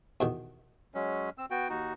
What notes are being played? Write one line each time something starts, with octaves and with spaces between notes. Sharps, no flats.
E2 B2 D#3
F#3 G#3 C#4
C4 E6
B3 F#4 G5
D#2 D#4 F#4